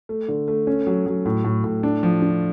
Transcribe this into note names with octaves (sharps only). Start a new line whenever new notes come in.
A3
D3
A3
C#4
F#3
F#3
A2
A2
A2
D4
F3
D4